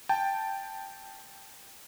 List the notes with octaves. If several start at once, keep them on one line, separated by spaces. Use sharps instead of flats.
G5 A5